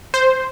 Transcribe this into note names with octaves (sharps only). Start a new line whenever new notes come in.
C5